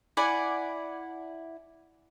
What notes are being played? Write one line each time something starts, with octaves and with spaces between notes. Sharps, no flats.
E4 D5 F#5 G#5